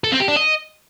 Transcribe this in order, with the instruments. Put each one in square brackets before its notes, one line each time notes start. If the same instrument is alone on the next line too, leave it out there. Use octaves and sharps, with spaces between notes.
[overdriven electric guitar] A4
C4
G4
D4
D#5